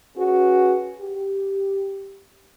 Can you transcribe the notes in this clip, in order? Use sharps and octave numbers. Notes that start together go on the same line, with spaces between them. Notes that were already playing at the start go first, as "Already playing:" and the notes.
C#4 F#4 G#4 B4
G4